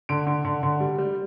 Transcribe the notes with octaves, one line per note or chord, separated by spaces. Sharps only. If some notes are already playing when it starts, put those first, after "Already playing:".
D3 D7
D3
D3
D3
G3
G3